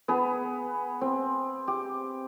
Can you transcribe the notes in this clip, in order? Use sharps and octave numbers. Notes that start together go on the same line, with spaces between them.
B3 G#4 B4
C4
G4